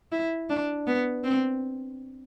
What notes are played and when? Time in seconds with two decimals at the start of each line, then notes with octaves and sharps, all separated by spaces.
0.12 E4
0.49 D4
0.87 B3
1.24 C4